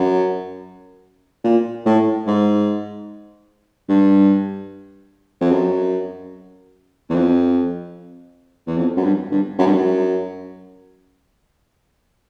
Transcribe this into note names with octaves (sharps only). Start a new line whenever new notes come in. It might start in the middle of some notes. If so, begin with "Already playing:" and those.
Already playing: F#2
A#2
A2
G#2
G2
F2
F#2
E2
F2
E2
F2
F#2
G2
G2
F#2
G2
F#2